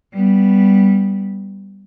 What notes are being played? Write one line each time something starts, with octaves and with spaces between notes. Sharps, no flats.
G3 B3